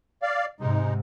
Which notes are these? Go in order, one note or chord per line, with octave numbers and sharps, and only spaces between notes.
D5 F5
G#2 C3 G#3 D#4